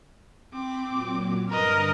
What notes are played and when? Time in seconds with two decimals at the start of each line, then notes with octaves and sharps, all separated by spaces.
0.53 C4 G5 B5 D6
0.88 A#2 F#3
1.50 G2 D3 D4 A#4 B4 D#5